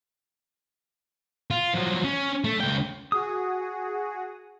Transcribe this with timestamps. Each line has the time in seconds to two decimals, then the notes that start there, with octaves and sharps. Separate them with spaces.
1.51 F4
1.74 F3 F#3
2.04 C#4
2.44 A3
2.60 C#2 G5
3.12 F#4 G#4 D#6